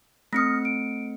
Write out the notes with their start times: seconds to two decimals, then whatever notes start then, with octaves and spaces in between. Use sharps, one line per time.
0.33 A3 C4 D#6 F6 A#6 C#7
0.65 D7